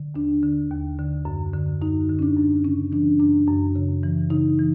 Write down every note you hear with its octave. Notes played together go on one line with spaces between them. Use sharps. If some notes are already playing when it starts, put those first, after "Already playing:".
Already playing: D3
D#2 D4
D3
D#2
D3
F#2
D3
F#2 D#4
D3
C#4
D4
F#2
C#3 C#4
E3 D4
F#2 D4
F#2
C#3
E3
C#3 D#4
E3